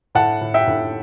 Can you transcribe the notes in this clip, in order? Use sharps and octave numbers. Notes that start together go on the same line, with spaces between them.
A2 F#5 A5
A2
E5 G5
A2